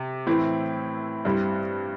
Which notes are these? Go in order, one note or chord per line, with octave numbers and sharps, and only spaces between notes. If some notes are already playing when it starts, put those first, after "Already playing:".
Already playing: C3
A2 E3 C4 E4
G2 G3 C4 E4